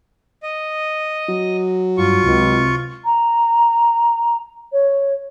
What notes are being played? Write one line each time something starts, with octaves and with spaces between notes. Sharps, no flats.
D#5
F#3
G2 F4 C#6
C#2 C3
A#5
C#5